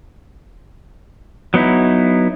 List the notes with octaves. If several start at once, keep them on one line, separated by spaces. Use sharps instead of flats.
F#3 B3 D#4 E4